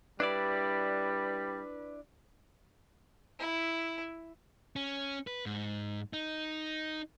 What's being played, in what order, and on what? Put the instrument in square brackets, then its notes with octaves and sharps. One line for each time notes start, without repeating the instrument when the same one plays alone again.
[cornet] G3 [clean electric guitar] D4 E4 D5 [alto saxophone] B4
[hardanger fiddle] E4
[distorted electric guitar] C#4
B4
G#2
D#4